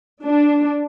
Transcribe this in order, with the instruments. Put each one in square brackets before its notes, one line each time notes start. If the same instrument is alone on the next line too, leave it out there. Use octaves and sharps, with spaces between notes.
[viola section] D4